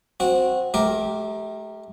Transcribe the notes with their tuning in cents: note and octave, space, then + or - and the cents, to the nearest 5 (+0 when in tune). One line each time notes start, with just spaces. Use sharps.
C4 +0 F#4 -15
A3 -35 G4 -5 A#4 +0